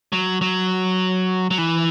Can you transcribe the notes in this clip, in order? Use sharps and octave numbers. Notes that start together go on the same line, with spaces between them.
F#3
F#3
F#3
E3